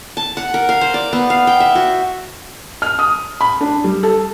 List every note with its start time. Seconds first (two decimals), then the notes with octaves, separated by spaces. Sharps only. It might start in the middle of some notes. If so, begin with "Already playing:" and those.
0.17 A5
0.37 F#5
0.54 A#4
0.69 F5
0.81 C5
0.94 D5
1.13 B3
1.30 F5
1.47 G5
1.60 E5
1.75 F#4
2.82 F6
2.99 D#6
3.41 B5
3.61 D4
3.84 G3
4.03 A4